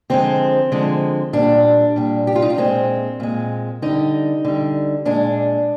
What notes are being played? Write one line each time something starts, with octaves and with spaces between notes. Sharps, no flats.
D3 F3 G#3 C4
D3 F3 G#3
A#2 G3 D4
A#2 G3
G4
F4
D#4
D4
A#2 G#3 C4
A#2 G#3
D3 G3 D#4
D3 G3
A#2 G#3 D4